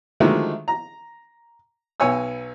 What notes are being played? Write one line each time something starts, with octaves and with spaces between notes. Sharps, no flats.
D3 D#3 F3 F#3 G#3 A3
A#5
B1 B3 C#5 G#5 E6